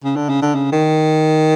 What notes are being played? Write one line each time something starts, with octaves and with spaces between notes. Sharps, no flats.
C#3
D3
C#3
D3
C#3
D#3